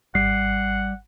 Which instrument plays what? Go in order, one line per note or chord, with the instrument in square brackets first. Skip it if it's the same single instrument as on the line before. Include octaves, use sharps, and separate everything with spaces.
[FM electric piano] G#1 [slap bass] G3 [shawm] F#5 [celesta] C7